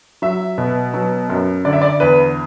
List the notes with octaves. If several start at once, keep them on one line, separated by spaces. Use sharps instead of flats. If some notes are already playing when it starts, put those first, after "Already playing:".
F#3 E5
B2
F#3
F#2
D3 D5
E5
D5
E2 B4